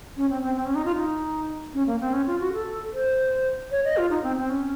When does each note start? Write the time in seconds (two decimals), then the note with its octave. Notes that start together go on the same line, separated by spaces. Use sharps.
0.17 C#4
0.30 C4
0.42 C4
0.56 C4
0.65 C#4
0.75 D#4
0.85 F4
0.96 D#4
1.74 C#4
1.87 A#3
2.01 C4
2.13 C#4
2.27 F4
2.40 F#4
2.53 A4
2.93 C5
3.71 C#5
3.85 D#5
3.97 F4
4.10 D#4
4.23 C4
4.37 C4
4.50 C#4